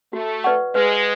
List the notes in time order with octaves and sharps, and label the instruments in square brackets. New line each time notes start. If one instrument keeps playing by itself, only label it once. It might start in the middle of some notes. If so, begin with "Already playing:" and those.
[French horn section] A3 [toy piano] F#4
[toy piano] B4 D5 F#5 C#6
[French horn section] G#3 [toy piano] B4